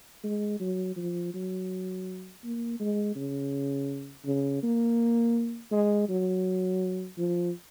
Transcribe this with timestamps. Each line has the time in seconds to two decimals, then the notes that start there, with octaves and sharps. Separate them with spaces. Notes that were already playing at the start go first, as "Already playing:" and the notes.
0.24 G#3
0.60 F#3
0.96 F3
1.34 F#3
2.43 A#3
2.80 G#3
3.16 C#3
4.25 C#3
4.63 A#3
5.71 G#3
6.09 F#3
7.18 F3